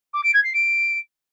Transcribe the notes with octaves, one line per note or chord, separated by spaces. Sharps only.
D6
D7
G#6
C7
D7